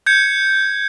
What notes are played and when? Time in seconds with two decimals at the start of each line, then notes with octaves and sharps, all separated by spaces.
0.06 G6 G#6 C#7